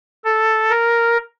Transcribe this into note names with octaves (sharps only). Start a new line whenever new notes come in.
A4
A#4